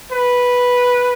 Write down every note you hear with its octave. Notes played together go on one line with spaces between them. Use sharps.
B4